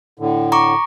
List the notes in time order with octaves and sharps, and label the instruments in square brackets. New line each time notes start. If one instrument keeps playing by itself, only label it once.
[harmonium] A2 D3
[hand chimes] A#5 C#6 D6